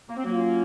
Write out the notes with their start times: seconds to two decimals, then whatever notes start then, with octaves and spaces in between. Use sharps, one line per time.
0.09 A#3
0.17 C4
0.24 F#3 A#3
0.32 C#4 F4